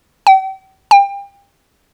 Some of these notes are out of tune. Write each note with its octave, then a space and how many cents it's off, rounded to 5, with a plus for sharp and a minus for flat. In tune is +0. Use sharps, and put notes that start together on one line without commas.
G5 -40
G5 +30